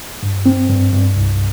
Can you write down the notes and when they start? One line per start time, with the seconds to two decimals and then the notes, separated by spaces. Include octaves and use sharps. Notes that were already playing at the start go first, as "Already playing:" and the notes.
0.23 G2
0.46 C4
0.69 G2
0.92 G2
1.15 C2